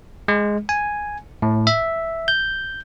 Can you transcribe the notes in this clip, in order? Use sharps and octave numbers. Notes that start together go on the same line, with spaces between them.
G#3
G#5
A2
E5
G6